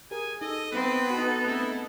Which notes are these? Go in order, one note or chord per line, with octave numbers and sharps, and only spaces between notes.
G4 G#4 A#4 G#5
D#4 A4 D#5
B3 C4 B4
D#4 F#4 A4
A3 C4 E4 G#4